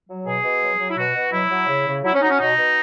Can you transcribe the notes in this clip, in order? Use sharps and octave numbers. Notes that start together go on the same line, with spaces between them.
F#3
B2 G#4
B2
F#3
F#3
E4
B2 F#4
B2
F#3 E4
F#3
C#3
C#3
F#3 E4
C#4
F#3 D#4
C#4
B2 D#4
B2